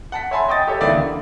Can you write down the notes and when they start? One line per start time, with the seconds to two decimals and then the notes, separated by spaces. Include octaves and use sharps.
0.12 F#5 A5 B6
0.31 C#5 E5 G#5 A5 B5 C6
0.48 D#5 G5 C#6 D#6 A6
0.67 G4 A4 C#5
0.81 C#2 D#3 E3 A#3 D5 E5
0.93 D3